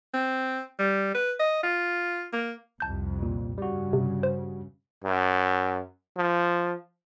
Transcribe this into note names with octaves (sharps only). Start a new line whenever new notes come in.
C4
G3
B4
D#5
F4
A#3
C2 F2 A5 G6
A#2
G2 C#3 G3 F#4
C3
C5
F#2
F3